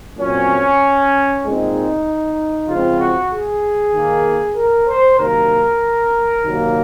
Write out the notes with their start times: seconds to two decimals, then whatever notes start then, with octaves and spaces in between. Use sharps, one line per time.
0.18 A#2 F#3 C4 C#4
1.43 A#2 G#3 C4 D#4
2.68 C#3 F3 G#3 C4 F4
3.00 F#4
3.31 G#4
3.94 D#3 A#3
4.56 A#4
4.88 C5
5.19 C3 D#3 F#3 A#3 A#4
6.44 C3 D#3 F#3 A#3